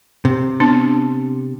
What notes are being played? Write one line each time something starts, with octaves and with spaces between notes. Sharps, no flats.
C3
B3 D4 A5